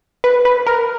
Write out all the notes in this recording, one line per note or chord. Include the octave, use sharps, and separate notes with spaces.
B4
B4
A#4